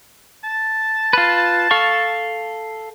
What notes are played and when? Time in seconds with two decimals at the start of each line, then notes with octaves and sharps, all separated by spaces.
0.44 A5
1.13 F4 B4
1.71 A4 F5 C#6